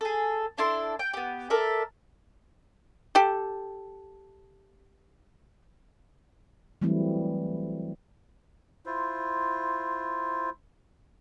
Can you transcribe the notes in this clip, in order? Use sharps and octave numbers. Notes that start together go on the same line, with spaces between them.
G#4 A4
D4 E4 A4 C6
G5
B3 G4
A4 A#4 D5 E5
G4 A4
E3 F#3 G3 A3 C4 E4
E4 F4 C5